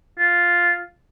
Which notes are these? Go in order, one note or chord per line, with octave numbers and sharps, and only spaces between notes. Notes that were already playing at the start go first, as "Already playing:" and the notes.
F4